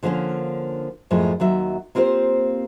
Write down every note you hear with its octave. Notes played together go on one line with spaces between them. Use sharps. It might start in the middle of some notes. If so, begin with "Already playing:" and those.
D3 F3 A#3 C4 C#4
F#2 A2 F3 G#3
D#2 F#3 E5
A#3 C4 F4 G4 C5